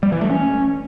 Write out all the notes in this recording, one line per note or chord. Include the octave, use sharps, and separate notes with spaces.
G3
E3
A3
C#4